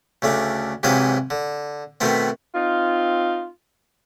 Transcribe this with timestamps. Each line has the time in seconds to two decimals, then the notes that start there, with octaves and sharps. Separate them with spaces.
0.22 D2 C#3 A3 D4
0.83 G#2 C3 E3 F#3 D#5 F5
1.30 D3
2.00 B2 D#3 A3 B3 C4
2.55 C4 D#4 F4